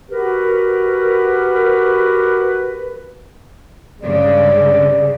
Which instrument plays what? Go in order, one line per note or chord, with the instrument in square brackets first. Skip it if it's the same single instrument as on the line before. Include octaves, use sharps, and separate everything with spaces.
[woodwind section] F#4 G4 A#4 B4
[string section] G2 C#3 G#3 [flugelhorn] D5